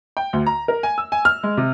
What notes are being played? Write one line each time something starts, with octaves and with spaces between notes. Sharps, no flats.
G5
D2
A#5
A#4
G#5
E6
G#5
F6
G#3
C3